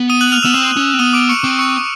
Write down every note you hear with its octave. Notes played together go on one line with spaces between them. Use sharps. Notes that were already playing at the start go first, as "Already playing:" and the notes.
Already playing: B3
D#6 D#7
F#6 F#7
F6 F7
B3 E6 E7
C4 E6 E7
C#4
C4
B3 D#6 D#7
D6 D7
C#6 C#7
C4 D6 D7
C#6 C#7